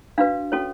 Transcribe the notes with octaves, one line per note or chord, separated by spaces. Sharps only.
D4 F#4 B4 F5
C#4 F#4 A4 C#5